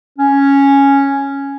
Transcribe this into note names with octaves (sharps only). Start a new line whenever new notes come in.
C#4